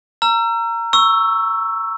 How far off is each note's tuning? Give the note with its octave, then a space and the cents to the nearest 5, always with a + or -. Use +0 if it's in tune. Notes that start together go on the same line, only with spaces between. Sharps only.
A#5 -5 E6 +40
C#6 +0 E6 +5